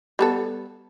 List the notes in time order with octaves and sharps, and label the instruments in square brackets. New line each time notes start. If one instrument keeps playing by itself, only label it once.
[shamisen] G3 B3 A4